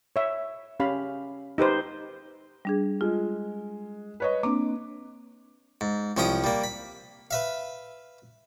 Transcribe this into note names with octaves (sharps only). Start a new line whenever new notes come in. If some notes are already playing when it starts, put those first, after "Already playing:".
C#5 E5
C#4 G4 F5 B5
D#4 G4 B4 C5
G3 D4 G#4
G#3 F4
B4 C#5 D#5
A#3 C4 D4 D6
G#2
C2 F3 C#4 F5 G5 D#6
G3 A#3
B5
B4 E5 F5